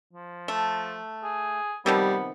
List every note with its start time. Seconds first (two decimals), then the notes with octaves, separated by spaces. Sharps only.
0.13 F3
0.48 A3
1.24 G#4
1.86 C3 D#3 F3 G3 B3